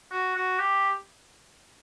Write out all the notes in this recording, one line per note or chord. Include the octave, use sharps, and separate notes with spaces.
F#4
F#4
G4